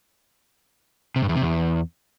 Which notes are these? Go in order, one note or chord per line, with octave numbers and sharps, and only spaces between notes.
C3
G2
E2
C3
E2